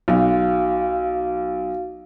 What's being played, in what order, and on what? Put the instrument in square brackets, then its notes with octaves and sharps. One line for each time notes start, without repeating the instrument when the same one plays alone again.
[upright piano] B1 [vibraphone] F#4 F5